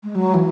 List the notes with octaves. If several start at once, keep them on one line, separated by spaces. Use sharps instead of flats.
G#3
F#3
E3